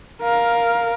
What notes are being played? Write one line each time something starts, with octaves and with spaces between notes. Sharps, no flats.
A#4 F5